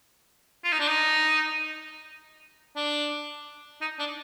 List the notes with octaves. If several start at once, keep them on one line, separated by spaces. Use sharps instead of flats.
F4
D#4
D4
D#4
D4
D#4
D4